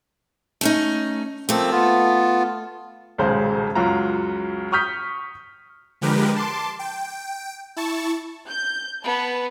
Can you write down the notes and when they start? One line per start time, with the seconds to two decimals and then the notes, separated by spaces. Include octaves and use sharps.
0.61 A3 C#4 D#4
1.49 F3 A3 A#3 C4 A4
1.72 B3 F4
3.18 D#1 B1 C#3 G#3 C5
3.75 C#2 F#2 F#3 F4 F#4 A#5
4.72 C#6 D#6 F6 G6 B6
6.01 D3 F3 G#3 G4 A#4 B4
6.36 A5 C6 D6
6.79 G5
7.76 E4 A5 C#6
8.48 G6
9.04 B3 B4 A5